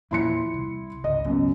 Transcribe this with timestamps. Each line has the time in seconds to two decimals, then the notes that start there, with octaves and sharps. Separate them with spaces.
0.11 E2 A#2 F3 E4 C6 C#7
0.54 C2
1.04 G#1 C#2 D#5
1.25 F#2 B2